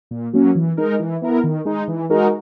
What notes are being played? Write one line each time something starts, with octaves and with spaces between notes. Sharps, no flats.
A#2
F#3 A#3 C#4
E3
G#3 D#4 A#4
E3
B3 E4 A#4
D#3
G#3 D#4
E3
G#3 D#4 F#4 A#4